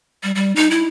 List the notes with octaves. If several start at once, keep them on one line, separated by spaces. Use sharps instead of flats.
G3
G3
D#4
E4